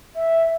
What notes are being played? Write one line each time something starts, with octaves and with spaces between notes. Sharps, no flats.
E5